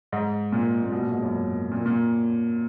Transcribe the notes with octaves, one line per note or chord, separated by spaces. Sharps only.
G#2
A#2
A#2
B2
A#2
G#2
F#2
A#2
A#2